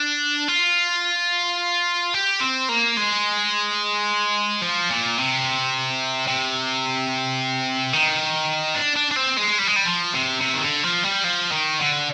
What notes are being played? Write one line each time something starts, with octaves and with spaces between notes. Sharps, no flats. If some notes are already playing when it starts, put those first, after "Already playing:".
Already playing: D4
F4
G4
C4
A#3
G#3
F3
A#2
C3
C3
D#3
D4
D4
D4
C4
G#3
G3
G#3
G3
F3
C3
C3
D#3
D3
F3
G3
F3
D#3
D3